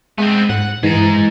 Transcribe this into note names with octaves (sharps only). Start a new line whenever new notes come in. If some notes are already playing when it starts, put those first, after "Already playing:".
G#3 B3 C4
G#2 F#5
G2 E3 G#3 A#5